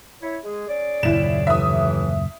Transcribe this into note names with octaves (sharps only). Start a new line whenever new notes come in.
E4 C#5
G#3 G#4
C#4 G#4 D5
F#1 D#2 A#2 E4 E7
A2 C3 E3 E5 D#6